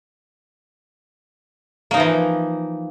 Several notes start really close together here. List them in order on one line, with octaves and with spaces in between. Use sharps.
A#3 D#4 E3 F3